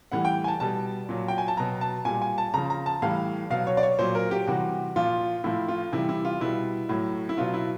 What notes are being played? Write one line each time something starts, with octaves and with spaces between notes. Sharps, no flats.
A2 E3 G3 F#5
G5
G#5
A5
B2 G3 A5
A#2 F#3
G5
G#5
A5
B2 F#3 A#5
A5
A#2 G3 G#5
G#5
A5
C#3 F3 A#5
A#5
A5
A2 E3 G3 F5
B2 F#3 F5
C#5
D5
C#5
A#2 F#3 C5
A#4
G4
C3 E3 G3 F#4
A#2 F3 F4
A2 F3 E4
F4
C3 E3 G3 E4
E4
F4
B2 G3 E4
A2 F#3
E4
B2 F#3 F4
E4